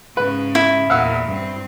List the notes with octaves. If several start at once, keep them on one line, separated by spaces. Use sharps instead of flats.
G#2 C#3 B4
E4
E2 A#2 F5 F#5 E6
G2 C4